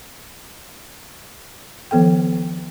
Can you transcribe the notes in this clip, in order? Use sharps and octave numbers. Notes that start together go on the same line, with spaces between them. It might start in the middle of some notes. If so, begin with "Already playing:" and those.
D#3 F3 B3 A4 G5